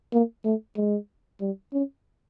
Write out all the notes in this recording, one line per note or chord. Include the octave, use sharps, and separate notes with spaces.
A#3
A3
G#3
G3
C#4